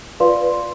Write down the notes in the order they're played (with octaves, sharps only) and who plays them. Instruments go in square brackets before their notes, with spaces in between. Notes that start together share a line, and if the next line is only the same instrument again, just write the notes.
[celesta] F4 B4 D5 F5 C6